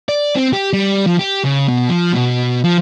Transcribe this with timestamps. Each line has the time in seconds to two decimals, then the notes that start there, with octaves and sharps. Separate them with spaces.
0.09 D5
0.35 C4
0.53 G4
0.73 G3
1.06 F3
1.19 G4
1.44 C#3
1.68 B2
1.89 F3
2.14 B2
2.64 F3